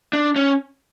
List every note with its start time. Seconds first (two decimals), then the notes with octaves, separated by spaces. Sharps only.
0.13 D4
0.36 C#4